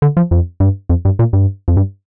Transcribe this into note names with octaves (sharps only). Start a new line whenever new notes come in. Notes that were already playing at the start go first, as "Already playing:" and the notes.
D3
F3
F2
G2
F2
G2
A#2
G2
F2
G2